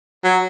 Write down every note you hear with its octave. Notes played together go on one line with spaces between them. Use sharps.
F#3